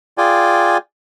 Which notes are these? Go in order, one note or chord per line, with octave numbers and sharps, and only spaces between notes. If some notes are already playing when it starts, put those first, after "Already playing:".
F4 G#4 D5 G5 G#5